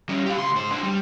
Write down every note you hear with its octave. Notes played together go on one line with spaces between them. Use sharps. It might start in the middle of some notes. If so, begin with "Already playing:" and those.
G3 C#4
G4 F5
C#2 C6
G#2 C5
D4 C5
G3